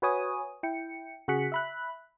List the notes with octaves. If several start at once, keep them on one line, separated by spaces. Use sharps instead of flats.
F#4 B4 C#5 G#5 D#6
E4 G5 C#7
C#3 F#4 G#4 F#6 B6 C#7
E5 B5 F#6